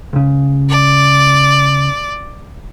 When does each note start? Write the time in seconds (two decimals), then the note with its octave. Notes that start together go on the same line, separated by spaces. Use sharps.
0.13 C#2 C#3
0.70 D5